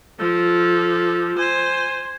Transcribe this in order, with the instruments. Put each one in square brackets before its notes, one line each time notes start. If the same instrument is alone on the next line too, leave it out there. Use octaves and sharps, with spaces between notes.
[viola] F3 [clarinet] A4
[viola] C5 [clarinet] G#5